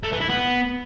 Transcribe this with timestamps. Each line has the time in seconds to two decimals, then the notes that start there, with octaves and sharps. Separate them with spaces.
0.03 A3
0.12 E3
0.21 E4
0.29 B3